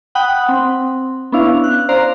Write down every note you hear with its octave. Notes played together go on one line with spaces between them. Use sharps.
F#5 G5 B5 D#6 F#6
C4
B3 C#4 D4 E4 F5
F#6
C5 D5 F5 A#5 C6